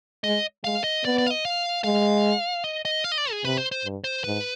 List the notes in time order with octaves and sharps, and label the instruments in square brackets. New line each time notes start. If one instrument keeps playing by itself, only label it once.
[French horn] G#3 [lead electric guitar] D#5
[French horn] G#3 [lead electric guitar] F5
[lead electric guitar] D#5
[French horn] B3 [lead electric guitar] D5
[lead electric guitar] D5
F5
D#5
F5
[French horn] G#3 [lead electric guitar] F5
[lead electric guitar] D#5
D#5
F5
D#5
D5
G#4
[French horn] C3 [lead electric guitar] B4
[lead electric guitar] C5
C5
[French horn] G2
[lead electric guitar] C5
[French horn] G#2 [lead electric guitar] B4